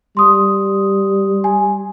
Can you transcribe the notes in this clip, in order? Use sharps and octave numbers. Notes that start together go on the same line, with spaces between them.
G3 C6 D#6
G#5